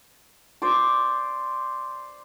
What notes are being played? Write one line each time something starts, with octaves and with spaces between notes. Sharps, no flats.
C5 D5 D6